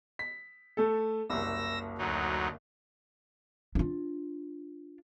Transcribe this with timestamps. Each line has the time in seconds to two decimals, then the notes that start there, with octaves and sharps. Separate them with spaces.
0.19 B6
0.77 A3 A4
1.30 F#1 C2 E6 A#6
1.98 D2 F#3 D#4
3.75 D4 F4